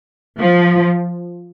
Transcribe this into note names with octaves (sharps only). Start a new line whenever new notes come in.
F3